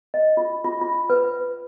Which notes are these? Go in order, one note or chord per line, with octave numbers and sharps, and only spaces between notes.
D#5
F4
F4
F4
B4